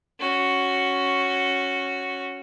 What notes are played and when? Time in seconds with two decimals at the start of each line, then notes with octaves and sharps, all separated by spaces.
0.20 C#4 F#4